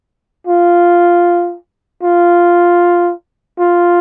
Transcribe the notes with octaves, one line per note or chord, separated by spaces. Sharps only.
F4
F4
F4